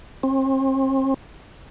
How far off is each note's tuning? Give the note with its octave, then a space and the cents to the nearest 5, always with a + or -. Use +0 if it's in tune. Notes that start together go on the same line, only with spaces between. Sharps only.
C4 +40